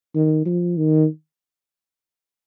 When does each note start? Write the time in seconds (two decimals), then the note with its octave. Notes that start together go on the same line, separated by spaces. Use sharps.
0.15 D#3
0.46 F3
0.77 D#3